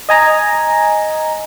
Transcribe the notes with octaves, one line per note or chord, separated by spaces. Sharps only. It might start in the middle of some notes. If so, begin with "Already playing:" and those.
D#5 G#5 A#5